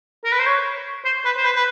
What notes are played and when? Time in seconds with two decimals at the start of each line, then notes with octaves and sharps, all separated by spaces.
0.24 A#4
0.32 B4
0.40 C5
0.46 C#5
1.05 C5
1.25 B4
1.37 C5
1.44 B4
1.55 B4